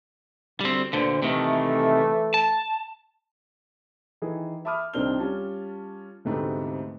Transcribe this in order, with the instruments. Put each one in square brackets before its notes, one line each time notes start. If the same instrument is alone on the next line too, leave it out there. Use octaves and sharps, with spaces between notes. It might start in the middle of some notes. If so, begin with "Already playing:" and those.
[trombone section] D2 [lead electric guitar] G3 C4
[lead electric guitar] D2 D3 [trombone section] A#2 B4 C5
[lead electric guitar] C3 D#3 [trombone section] E3 A3
[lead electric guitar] A5
[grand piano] D#3 E3 G#4
E5 A5 B5 D6 D#6 F6
C2 D#3 C4 D4 F6 G7
G3 C#4 F4 A5
D2 G#2 C3 A3 B3 C4